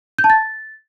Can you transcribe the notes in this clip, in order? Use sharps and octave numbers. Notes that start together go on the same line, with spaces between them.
G6
A5
A6